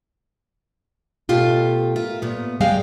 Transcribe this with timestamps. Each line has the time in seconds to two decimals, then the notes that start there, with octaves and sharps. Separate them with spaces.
1.29 B2 A3 F4 G4
1.96 F4 A#4 E5
2.22 A#2 B3
2.61 G2 G3 G#3 G4 F5